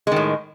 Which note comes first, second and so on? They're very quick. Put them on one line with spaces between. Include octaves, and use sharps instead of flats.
G#3 D#3 A2